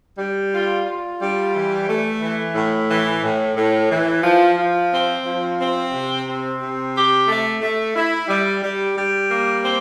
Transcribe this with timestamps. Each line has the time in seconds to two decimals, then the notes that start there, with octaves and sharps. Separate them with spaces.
0.18 G3
0.53 F4
0.86 F4
1.20 G3
1.54 E3
1.88 A3
2.22 E3
2.55 A2
2.89 E3
3.23 A2
3.57 A2
3.90 E3
4.23 F3
4.58 F3
4.91 C4
5.25 F3
5.59 C4
5.93 C3
6.26 C4
6.60 C3
6.94 G4
7.28 A3
7.61 A3
7.95 E4
8.28 G3
8.62 G3
8.97 G3
9.29 A#3
9.64 C4